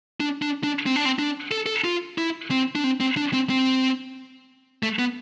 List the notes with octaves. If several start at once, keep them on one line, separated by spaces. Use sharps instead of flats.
D4
D4
D4
C4
D4
C4
D4
A4
A4
F4
E4
C4
D4
C4
C4
D4
C4
C4
A3
B3